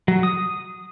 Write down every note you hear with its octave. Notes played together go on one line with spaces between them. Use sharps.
F#3
D#6